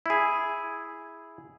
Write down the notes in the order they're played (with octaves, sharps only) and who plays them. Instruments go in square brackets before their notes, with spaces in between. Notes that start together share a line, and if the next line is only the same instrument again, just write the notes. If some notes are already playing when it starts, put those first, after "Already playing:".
[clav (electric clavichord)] E4 G#4